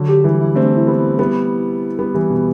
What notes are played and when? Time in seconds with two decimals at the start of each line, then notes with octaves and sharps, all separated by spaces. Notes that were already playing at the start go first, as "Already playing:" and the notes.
Already playing: D3 F#3
0.08 G4
0.24 E3 G3 E4
0.41 E4
0.55 A3 C4 D4
0.77 E4
0.87 G3 B3
0.98 E4
1.19 G3 B3 E4
1.99 G3 B3
2.14 E3 G3
2.30 B2